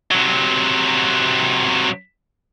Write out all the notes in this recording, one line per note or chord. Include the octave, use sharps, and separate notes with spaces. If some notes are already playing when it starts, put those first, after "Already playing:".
C3 F#3